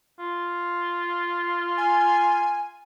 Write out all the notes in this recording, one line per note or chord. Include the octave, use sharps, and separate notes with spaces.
F4
G#5